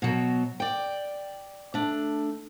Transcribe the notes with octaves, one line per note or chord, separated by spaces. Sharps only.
B2 F#3
D5 G5
A3 D4